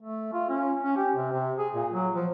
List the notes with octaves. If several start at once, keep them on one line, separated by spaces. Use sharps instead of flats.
A3
F4
C#4
C#4
G4
C3
C3
G#4
A#2
F#3
F3